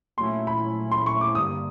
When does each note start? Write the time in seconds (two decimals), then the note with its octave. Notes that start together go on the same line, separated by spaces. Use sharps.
0.17 A#2 F#3 A3 C#4 E4 C6
0.47 B5
0.92 C6
1.06 C#6
1.21 D6
1.35 G2 D3 G3 A#3 D#6